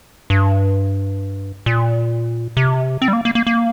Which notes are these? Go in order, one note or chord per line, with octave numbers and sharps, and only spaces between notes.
G2
A#2
C3
C4
G3
A#3
A#3
A#3
A#3